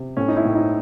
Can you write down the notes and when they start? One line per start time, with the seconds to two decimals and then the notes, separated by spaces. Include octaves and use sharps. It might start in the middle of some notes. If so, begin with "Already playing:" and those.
Already playing: C3
0.17 A2 C#4
0.28 D#4
0.37 E4
0.45 A2
0.55 D#4